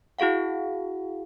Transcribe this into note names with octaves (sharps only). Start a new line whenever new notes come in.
E4 F#4 G#4 F5 F#5